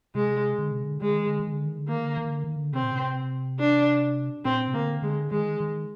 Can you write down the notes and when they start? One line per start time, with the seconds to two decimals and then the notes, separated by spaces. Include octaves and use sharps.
0.15 C3 G#3
0.59 D3
0.72 C3
0.84 D3
1.01 D3 G#3
1.14 D#3
1.27 D3
1.39 D#3
1.53 D3
1.66 D#3
1.79 D3
1.88 D#3 A#3
2.04 D3
2.17 D#3
2.30 D3
2.44 D#3
2.56 D3
2.73 C3 C4
2.83 A#2
2.92 C3
3.59 D4
4.45 A#2 C4
4.68 C3
4.74 D3 A#3
5.02 D3 G#3
5.31 D#3 G#3
5.60 D#3